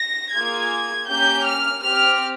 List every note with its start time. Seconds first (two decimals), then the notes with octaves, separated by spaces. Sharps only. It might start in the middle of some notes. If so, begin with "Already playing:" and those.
Already playing: A#6
0.33 A#3 F4 G#4 G#6
1.08 A#3 C#4 G4 G6
1.46 F6
1.82 C4 G4 F6